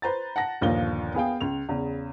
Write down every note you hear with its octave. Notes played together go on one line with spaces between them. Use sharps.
B4 C5 A#5 A6
F#5 A5 A#6
G1 D#2 A#2 F3 F4 G7
B3 G#4 F5 G5
C#2 F7
E2 C#3